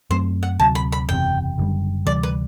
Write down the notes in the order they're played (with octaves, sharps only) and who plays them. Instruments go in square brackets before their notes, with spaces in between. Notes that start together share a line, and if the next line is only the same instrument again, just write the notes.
[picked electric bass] F#2 F#3 A3 C4 [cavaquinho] C5
[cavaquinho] F#5
[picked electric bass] D2 C3 F#3 [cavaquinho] A5
[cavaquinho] B5
B5
[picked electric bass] F#1 E2 C3 [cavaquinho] G5
[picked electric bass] F#1 F#2 D3 G3
[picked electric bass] D2 C3 E3 G3 [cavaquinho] D5
[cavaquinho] B4